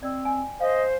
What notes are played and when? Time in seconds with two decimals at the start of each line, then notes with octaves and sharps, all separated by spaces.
0.03 C4 D5 D#5
0.25 G5 G#5
0.60 C5 D#5 F5